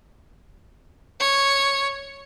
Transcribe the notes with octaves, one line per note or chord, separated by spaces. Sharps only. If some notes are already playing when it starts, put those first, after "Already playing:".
C#5